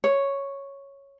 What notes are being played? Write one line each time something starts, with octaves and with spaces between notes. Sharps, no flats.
C#5